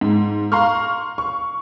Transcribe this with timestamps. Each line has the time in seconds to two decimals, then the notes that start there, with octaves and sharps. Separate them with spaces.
0.01 G#2
0.52 F5 A#5 C6 C#6 F6
1.18 C#6